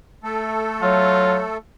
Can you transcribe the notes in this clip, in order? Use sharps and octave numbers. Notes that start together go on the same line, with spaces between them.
A3 A4
F#3 F4